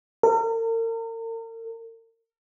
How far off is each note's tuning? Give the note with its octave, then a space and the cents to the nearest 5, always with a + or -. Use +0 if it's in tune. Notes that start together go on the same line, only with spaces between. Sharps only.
A#4 -40